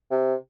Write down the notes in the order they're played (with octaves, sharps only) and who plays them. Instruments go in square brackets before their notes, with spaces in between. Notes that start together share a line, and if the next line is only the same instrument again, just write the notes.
[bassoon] C3